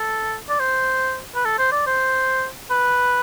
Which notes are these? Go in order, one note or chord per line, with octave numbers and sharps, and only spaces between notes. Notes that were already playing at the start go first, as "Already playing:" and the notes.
Already playing: A4
D5
C5
B4
A4
C5
D5
C5
B4